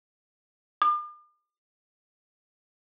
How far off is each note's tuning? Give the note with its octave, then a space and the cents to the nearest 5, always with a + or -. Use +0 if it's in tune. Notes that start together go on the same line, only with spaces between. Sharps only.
D6 +45